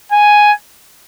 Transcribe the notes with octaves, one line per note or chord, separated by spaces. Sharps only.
G#5